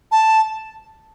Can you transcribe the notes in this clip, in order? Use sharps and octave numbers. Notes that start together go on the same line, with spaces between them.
A5